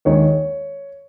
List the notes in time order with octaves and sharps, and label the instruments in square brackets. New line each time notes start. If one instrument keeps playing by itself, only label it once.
[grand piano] D#2 D#3 G#3 C#5